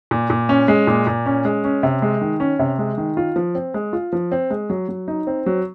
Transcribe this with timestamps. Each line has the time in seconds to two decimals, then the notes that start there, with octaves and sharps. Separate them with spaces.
0.11 A#2
0.30 A#2
0.49 C#4
0.68 G#3
0.87 A#2
1.07 A#2
1.26 C#4
1.45 G#3
1.64 C#4
1.83 C3
2.02 G#3
2.21 D#3
2.40 C#4
2.59 C3
2.78 G#3
2.98 D#3
3.17 F4
3.36 F3
3.55 C4
3.74 G#3
3.93 F4
4.13 F3
4.32 C4
4.50 G#3
4.70 F#3
4.89 F#3
5.08 D#4
5.27 C4
5.46 F#3